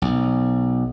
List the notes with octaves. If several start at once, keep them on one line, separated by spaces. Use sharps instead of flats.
B1